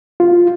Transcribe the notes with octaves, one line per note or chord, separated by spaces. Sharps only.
F4